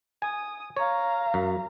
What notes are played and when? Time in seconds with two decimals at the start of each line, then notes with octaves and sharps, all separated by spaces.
0.22 G#5 D#6
0.77 C#5 F5 A#5
1.34 F#2